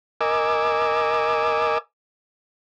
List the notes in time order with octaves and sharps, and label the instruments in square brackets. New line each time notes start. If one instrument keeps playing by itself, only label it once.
[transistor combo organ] A#4 D#5 G#5 D6 E6